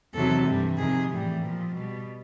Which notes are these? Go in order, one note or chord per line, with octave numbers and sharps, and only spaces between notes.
E2 C3 D#3 F#3 A4
G2 E3 G3
F2 C3 D#3 G#4
A2 E3 G3
A#2 F3
B2 G3